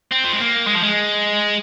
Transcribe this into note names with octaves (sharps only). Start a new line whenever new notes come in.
C4
F3
G#3
A#3
G#3
F3
G#3